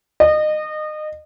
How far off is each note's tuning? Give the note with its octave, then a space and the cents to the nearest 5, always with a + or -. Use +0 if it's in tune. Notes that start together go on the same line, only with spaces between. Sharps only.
D#5 -25